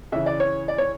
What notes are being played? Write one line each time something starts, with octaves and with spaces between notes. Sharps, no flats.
C#3 E3 E5
D5
C#5
D5
C#5